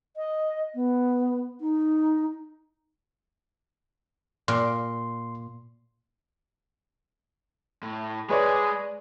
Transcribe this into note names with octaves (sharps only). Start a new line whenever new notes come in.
D#5
B3
D#4
A#2 C6
A2
G#3 G#4 B4 C#5 D5